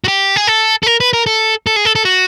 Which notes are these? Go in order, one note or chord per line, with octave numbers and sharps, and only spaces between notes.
F#4
G4
G#4
A4
A4
A#4
B4
A#4
A4
A4
G#4
A4
A4
F#4